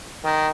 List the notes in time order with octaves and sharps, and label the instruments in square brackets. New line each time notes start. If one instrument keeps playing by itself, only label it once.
[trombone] D#3